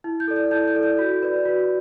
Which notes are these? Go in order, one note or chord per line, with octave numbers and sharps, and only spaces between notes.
E4
G6
A4 D5
G6
E4 G6
G6
A4 D5
G6
F#4
B4 D5
F#4